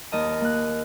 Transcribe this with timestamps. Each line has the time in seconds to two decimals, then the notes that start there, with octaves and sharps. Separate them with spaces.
0.12 D#2 A#4 D#5 A5
0.41 A#3 F#6